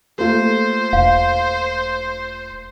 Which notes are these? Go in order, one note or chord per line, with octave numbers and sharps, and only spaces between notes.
A3 A#3 F4 C5
E1 F5